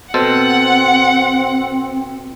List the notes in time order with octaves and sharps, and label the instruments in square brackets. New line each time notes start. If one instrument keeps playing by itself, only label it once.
[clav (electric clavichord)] B2 A4 C5 [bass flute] C4 [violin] F#5